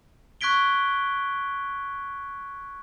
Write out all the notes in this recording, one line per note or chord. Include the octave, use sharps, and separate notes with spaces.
C#6 F#6 G#6 B6 D7 G7